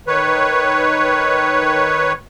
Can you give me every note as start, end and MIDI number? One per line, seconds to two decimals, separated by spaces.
0.07 2.13 51
0.07 2.13 71
0.07 2.13 73